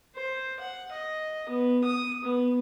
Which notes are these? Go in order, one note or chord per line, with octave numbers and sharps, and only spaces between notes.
C5
F#5
D#5
B3
D#6
B3